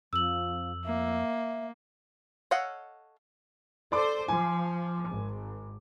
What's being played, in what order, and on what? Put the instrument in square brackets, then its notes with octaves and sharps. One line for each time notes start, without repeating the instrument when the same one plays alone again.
[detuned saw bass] F2 [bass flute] F3 [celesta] E6 F#7
[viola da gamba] A#3 [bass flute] E5
[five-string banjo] A4 C#5 D#5 F5 F#5
[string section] A4 C5 [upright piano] D5 C6 D6
[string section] F3 [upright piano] G#5
[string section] G#1